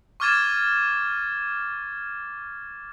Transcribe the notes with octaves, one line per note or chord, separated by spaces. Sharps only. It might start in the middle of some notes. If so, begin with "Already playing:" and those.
C#6 D6 F6 G#6 A6 E7